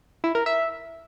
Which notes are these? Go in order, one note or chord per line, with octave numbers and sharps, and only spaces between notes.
E4
A#4
E5